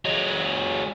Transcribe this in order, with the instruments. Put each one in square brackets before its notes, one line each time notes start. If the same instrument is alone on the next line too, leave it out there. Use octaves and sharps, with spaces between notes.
[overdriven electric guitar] F#3 G#3